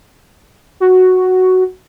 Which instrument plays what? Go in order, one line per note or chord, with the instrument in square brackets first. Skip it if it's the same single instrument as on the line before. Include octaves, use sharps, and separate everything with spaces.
[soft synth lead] F#4